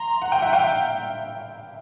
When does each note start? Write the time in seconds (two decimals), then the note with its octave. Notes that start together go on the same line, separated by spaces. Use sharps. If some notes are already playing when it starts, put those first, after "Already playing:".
Already playing: A#5 C6
0.22 F#5
0.32 G5
0.42 E5 F#5
0.53 F5 G5